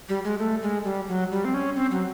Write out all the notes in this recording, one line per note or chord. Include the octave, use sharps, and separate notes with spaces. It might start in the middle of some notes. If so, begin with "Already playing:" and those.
G3
G#3
A3
G#3
G3
F#3
G3
C4
C#4
C4
F#3